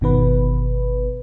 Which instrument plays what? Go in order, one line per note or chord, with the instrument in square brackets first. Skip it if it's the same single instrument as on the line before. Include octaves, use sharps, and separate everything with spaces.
[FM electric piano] G1 B2 D#3 B3 B4